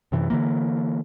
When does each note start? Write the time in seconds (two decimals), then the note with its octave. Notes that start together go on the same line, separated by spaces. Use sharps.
0.12 F#2 C3 E3
0.30 D3 E3 A#3